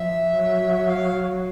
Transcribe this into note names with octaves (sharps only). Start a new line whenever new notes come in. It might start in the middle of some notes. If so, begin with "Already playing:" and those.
Already playing: F3 E5
F#3
F5